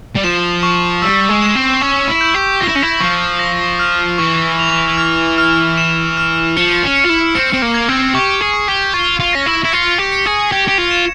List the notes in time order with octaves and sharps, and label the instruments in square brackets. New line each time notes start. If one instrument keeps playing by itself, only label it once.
[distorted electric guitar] G3
[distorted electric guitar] F3 [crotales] E7
[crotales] C#6
[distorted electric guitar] G3 [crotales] E6
[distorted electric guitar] G#3
[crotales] E7
[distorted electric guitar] C4
[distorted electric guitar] C#4 [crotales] C#6
[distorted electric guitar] E4
[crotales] G6
[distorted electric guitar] G4
[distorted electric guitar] F4 [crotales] A#6
[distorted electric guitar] E4
C#4
E4
[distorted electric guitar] F3 [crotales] C#6
[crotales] A#6
F6
[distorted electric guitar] E3 [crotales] C#6
[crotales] F7
F6
F6
E7
F6
[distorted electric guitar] F3 [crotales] C#7
[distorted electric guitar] C#4
[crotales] C#7
[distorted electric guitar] F4
E4
[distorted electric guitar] C4 [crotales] C#7
[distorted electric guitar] C4
A#3
[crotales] G#6
[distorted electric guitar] C4
[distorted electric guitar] G4 [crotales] C#6
[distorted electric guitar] G#4
[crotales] C#6
[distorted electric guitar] G4
[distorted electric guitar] F4 [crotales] C#6
[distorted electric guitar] F4
[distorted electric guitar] C#4 [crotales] A#6
[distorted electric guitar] E4
E4
[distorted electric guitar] F4 [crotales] C#7
[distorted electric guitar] G4
[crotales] C#7
[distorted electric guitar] G#4
[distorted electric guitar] G4 [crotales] G#6
[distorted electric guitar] G4
F4
[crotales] E7